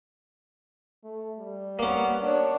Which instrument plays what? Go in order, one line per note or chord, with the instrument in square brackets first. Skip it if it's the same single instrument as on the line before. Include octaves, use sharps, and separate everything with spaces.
[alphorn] A3
G3
[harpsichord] A#3 C#4 [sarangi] B3
[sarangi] D4 [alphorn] C#5